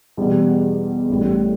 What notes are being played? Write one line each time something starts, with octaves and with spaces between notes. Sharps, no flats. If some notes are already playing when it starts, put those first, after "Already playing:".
E2 B2 G3
A1 A2 G3